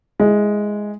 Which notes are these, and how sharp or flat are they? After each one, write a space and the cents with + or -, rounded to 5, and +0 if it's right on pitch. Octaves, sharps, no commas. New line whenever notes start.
G#3 +0 E4 -10